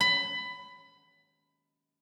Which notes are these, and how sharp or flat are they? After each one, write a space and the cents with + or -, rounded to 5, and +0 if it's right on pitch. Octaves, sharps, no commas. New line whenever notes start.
B5 +20